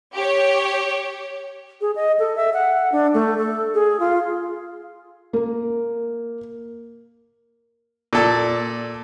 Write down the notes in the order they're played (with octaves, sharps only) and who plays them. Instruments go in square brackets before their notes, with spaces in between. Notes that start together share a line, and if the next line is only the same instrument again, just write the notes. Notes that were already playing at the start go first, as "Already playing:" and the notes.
[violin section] G4 C#5
[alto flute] G#4
D#5
A4
E5
F#5
D4
A3
A4
G#4
F4
[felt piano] A#3 A#4
[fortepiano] A#2 A4 D5